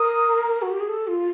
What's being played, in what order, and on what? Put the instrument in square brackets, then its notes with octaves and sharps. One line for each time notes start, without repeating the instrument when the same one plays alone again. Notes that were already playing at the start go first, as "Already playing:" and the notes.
Already playing: [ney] A#4 [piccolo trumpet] D#6
[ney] F#4
G4
G#4
A4
F4